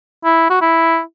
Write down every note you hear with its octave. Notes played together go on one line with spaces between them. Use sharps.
E4
F#4
E4